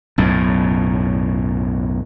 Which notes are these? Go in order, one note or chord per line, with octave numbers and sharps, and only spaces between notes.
B1 F#2 A2